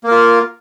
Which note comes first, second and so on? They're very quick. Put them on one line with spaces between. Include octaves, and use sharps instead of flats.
A#3 A#4 F4